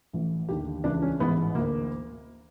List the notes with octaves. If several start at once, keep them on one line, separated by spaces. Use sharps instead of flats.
A1 A2 E3
D#2 D3 G4
C#2 C#3 E3 D4
C#4
A1 G#2 E3 B3
D2 D3 A#3